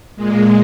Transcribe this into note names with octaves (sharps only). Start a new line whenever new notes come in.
A#2 G#3